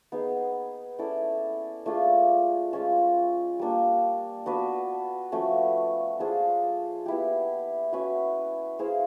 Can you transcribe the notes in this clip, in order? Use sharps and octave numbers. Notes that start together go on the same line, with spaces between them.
B3 D#4 G#4
C#4 E4 A4 D5
A3 D4 F4 G#4
G#3 C#4 F4
G3 A#3 D4
B3 D4 F#4 B4
F3 A3 C#4 F#4
D4 F4 G#4 C5
B3 E4 G4
C#4 F#4 B4 E5
E4 G#4 C5 F5